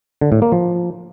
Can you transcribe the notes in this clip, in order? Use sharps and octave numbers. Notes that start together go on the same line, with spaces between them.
D3
A2
A#3
F3